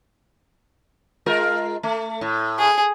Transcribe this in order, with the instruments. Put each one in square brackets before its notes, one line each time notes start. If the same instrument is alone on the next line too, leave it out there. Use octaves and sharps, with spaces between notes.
[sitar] G#3 F4 A#4
A3
A2
[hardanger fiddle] G#4